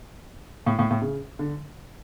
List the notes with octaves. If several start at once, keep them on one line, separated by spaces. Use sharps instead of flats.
A2
A2
A2
C#3
D3